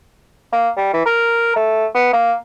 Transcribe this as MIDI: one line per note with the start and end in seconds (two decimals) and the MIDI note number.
0.53 0.70 58
0.76 0.92 55
0.94 1.01 52
1.06 1.51 70
1.56 1.86 57
1.95 2.10 59
2.13 2.34 58